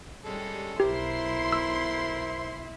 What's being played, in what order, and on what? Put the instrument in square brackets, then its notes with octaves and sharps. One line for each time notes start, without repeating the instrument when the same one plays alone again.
[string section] G3 [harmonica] G#3 C#4 A4
[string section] B1 C6 [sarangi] E4 [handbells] G4 [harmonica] A#4 C5
[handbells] E6